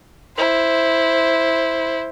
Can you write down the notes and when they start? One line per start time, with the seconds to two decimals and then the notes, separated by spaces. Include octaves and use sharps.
0.37 E4 C5